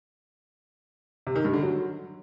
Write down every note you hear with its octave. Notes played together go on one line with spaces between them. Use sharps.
C3
D#3
G2
D3
F#3